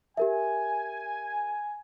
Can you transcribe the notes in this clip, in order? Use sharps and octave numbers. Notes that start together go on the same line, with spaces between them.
G4 A#4 E5 G#5